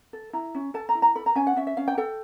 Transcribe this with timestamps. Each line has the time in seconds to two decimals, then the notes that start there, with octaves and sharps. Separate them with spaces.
0.13 A4
0.33 E4 A#5
0.55 C#4
0.74 A4 A5
0.89 A#5
0.95 E4
1.02 A#5
1.15 A4 B5
1.26 A#5
1.35 C#4 G#5
1.47 F#5
1.57 C#4 E5
1.67 E5
1.77 C#4 F5
1.88 G5
1.98 A4 G5